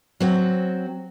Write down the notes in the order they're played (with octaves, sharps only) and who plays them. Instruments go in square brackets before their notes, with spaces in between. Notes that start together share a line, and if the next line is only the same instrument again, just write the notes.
[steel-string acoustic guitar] F#3 C4 F#4